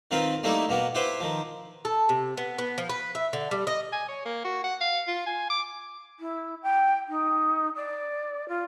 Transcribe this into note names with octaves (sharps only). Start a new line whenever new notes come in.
D#3 C4 F4 B4
G3 A3 A#3 D#4 E4
B2 A#3 B3
E4 G4 B4 C5
D#3 F3
A4
C3
B3
B3
F3
B4
E5
D3
G3
D#5
G#5
C#5
A#3
F#4
F#5
F5
F4
G#5
D6
E4
G5
D#4
D5
F4